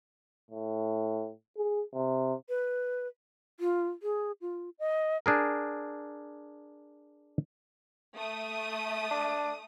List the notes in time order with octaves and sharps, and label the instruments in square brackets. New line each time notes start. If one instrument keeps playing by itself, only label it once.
[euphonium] A2
G#4
C3
[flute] B4
[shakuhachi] F4
G#4
F4
D#5
[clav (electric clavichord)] D4 G#4 A#4
[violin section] A3 D#6
[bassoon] D4